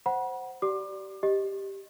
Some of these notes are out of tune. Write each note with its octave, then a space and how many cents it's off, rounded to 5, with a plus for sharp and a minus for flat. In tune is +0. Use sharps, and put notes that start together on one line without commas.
C5 +0 F#5 +10 B5 -40
G4 -35 D5 +0 D6 +30
G4 +0 D#5 +0